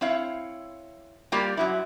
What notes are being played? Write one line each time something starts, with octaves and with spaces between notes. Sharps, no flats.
C4 E4 C#5 F5
G3 A#3 F4 G4 D5
F#2 F#3 E4